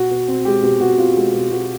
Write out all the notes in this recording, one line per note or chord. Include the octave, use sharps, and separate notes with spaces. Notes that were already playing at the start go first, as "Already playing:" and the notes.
Already playing: B2 F#4
B2
C4
G#3 G4
B2 G4
B2 F#4
C4 F4
G#3
B2
B2 F#4